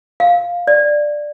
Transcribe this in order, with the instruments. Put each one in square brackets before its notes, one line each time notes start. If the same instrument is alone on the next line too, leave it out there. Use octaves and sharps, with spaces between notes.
[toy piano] F5
D5